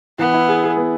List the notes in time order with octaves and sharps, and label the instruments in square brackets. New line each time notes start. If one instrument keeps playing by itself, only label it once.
[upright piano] E3 [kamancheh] B3
[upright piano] E4
G#4
G#4
B3